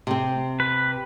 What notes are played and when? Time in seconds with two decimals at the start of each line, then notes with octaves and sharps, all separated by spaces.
0.07 C3 C4
0.60 B4